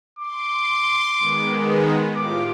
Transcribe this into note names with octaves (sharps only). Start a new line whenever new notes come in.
C6 D6
D#3 G#3 B3
A2 F4 G4 D6